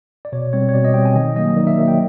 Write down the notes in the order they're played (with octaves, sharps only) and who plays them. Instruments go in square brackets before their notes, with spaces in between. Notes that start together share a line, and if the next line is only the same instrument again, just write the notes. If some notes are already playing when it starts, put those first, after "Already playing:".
[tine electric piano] D5
B2 C#5
G3 C4 C#5
C#5
B2 D5
D#5
G3 C4 G5
G#5
D#3 D#5
F#3 A#3 D#5
D#3 D5
E5
F#3 A#3
G5